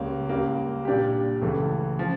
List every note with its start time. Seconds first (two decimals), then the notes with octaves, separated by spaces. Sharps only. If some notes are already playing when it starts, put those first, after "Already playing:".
Already playing: C#2 C#3 G3 A#3 C#4
0.29 C#2 C#3 G3 A#3
0.85 A#2 G3 D4 G4
1.42 C#2 C#3 E3 A3
1.99 C#3 F3